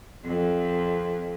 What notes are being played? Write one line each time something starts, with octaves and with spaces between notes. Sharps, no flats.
F2